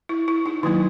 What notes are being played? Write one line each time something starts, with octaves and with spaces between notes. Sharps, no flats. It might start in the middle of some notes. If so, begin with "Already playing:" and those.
E4
E4
D#4
D#3 F#3 A#3 D#4 E4